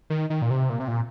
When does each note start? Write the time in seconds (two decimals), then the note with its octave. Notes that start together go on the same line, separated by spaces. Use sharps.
0.10 D#3
0.30 D#3
0.42 A#2
0.50 C3
0.70 A#2
0.80 C3
0.88 A#2